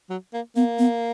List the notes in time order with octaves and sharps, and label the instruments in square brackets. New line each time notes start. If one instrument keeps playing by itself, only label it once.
[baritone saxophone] F#3
A#3
[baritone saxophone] A#3 [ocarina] B3
[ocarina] B3